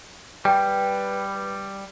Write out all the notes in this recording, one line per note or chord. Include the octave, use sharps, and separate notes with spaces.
G3 B4 G5